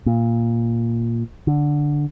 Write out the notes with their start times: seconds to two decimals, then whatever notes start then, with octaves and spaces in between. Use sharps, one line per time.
0.06 A#2
1.47 D3